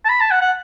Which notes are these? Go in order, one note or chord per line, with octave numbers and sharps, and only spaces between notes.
A5
B5
A5
F#5
F#5